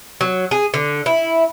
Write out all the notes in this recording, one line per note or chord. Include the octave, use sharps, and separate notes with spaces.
F#3
G#4
D3
E4